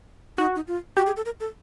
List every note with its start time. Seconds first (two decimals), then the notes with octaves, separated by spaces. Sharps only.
0.38 D#4 F#4
0.56 D#4
0.67 F4
0.97 F#4 G4
1.06 G#4
1.17 A4
1.26 A#4
1.40 A4